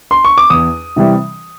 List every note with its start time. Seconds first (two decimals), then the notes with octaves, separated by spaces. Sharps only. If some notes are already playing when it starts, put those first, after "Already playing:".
0.11 C6
0.25 C#6
0.38 D6
0.50 E2 D#6
0.96 C3 E3 G3